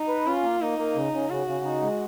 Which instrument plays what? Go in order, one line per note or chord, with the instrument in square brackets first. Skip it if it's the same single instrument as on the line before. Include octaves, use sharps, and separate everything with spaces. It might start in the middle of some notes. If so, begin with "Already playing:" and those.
Already playing: [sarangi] D#4
[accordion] B4
[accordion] C#4 [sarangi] F4
[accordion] A#3
[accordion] A#3 [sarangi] D#4
[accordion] A#3
C#3
C#3
[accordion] C#3 [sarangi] F#4
[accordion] C#3
D#4
G#3